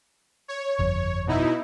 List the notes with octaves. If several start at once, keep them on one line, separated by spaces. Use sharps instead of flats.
C#5
G1 F2
B2 D#4 E4